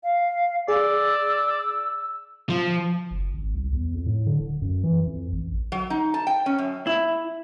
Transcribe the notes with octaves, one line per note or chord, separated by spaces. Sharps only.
F5
G#4 D5 E6
F3
F#1
G#1
C2
E2
F2
A2
D3
D1
F#2
E3
F2
A1
F#3
D#4
A5
G5
C#4
F#2
E4